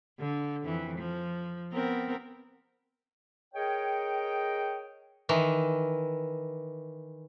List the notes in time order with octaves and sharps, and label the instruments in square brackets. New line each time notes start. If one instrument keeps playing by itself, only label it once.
[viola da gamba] D3
F2 E3
F3
B3 C4 A#4
[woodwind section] G#4 A#4 C#5 D#5 G5
[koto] D#3 E3